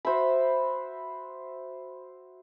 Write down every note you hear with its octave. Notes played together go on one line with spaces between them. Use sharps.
F#4 C5 E5 B5